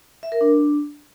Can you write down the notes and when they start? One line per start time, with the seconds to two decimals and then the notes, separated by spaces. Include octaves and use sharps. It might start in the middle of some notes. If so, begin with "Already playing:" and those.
0.23 E5
0.32 A#4
0.41 D4